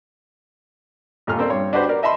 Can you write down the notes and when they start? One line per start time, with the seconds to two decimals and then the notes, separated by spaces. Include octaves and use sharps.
1.27 D#2 A#2 A3 F6
1.39 A#3 C4 A4 D5
1.50 G2 C#5 C6
1.73 D4 F#4 G4 B4 C5
1.89 A#4 D5
2.03 D#5 E5 A5 B5 C6